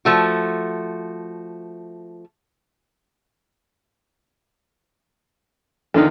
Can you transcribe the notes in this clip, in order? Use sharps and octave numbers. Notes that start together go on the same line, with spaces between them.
F3 A3 F#4
E2 D3 D#3 D#4 F4 A4